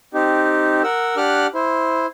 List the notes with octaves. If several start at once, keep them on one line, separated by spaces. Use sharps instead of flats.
C4 D#4 G4
A#4 F#5 E6
D4 G4 F#5 D6 F6 F#6
E4 C5